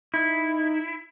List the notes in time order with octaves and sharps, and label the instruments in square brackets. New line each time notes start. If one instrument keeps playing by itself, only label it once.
[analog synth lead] D#4 [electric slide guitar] E4